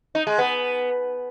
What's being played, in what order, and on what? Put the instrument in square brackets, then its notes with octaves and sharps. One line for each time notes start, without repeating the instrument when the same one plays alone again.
[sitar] D#4
G#3
B3